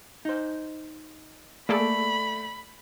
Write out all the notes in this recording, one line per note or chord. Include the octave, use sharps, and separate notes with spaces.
D#4 C5
A3 A#3 G#4 A4 D5 B5